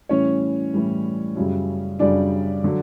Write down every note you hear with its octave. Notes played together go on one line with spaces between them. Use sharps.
A2 E3 G3 C#4 C#5
A2 E3 G3
F#2 C#3 G3
F#2 C#3 G3 D4 D5
D3 F#3